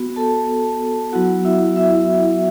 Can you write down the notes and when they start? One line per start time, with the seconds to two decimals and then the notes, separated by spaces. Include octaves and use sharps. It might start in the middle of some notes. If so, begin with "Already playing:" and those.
Already playing: B3 F#4
0.16 A4 A5
1.12 F#3 B3 E4 F#4 F#5
1.45 E4 E5
1.76 E4 E5